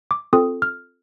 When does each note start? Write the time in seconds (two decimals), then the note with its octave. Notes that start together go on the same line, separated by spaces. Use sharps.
0.11 D6
0.33 C4 F4 A4 D#6
0.62 F6